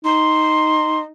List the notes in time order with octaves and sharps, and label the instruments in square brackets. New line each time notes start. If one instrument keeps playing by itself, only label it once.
[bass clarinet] D#4 [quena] C6